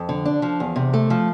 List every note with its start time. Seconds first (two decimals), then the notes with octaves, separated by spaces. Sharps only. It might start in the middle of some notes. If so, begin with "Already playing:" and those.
Already playing: F2
0.09 D3
0.25 D4
0.42 F3
0.60 E2
0.76 C3
0.94 A3
1.10 F3